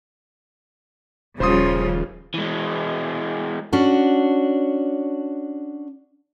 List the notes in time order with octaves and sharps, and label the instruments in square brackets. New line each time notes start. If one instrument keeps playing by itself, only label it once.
[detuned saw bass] D#1 [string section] C#3 F3 [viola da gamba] G3 F4 [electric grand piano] C5 C6 D#6
[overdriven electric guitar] E3 G#3
[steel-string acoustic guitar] C#4 D4 F#4